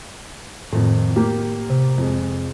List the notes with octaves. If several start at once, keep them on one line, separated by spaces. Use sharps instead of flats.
G#1 F2 A2
A#3 G4
C3
F2 G#3